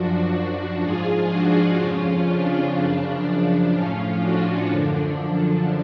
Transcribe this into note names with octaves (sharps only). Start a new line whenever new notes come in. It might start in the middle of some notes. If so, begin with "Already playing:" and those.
Already playing: F#2 F3 D4 F#4
D4 F#4
G#2 F3 F4 G#4
D4 F#4
F2 C#3 F3 C#4 F4
D4
F#2 C#3 F3 D4
D4
A2 F3 C#4 F4
D4 F#4
F#2 D3 F3 D4